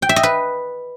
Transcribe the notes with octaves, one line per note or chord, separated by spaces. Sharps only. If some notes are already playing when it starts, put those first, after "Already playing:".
G5
E5
D#5
B4